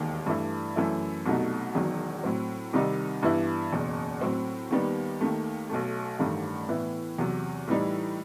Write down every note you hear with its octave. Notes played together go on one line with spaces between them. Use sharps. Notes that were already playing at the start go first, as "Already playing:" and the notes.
Already playing: E1 D#2 D#3
G2 E3 A3 E4
F#2 E3 A3 E4
C2 B2 F#3 A3 D#4
E1 E2 D#3 F#3
A2 F#3 C4
C2 C3 D#3 G3 D#4
G2 E3 B3 E4
F#1 E2 B2
A2 F#3 C4
D#2 D#3 G3 B3
D#2 D#3 A3
B1 B2 A3
A1 G2 D#3 A3
A2 E3 B3 E4
E2 C3 F#3
A2 E3 G3 D#4